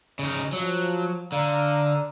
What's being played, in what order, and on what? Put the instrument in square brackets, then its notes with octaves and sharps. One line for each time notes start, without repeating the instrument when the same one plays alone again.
[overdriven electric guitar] C#3 D#4
[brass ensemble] F3 [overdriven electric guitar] F#3
[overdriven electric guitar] D3 [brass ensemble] F5 A#5